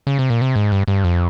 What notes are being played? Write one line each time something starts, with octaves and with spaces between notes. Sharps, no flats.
C#3
C3
A#2
C3
G#2
G2
G2
F2